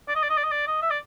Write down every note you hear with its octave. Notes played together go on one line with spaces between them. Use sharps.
D5
D#5
D5
D#5
D5
D#5
D5
D#5
E5
D5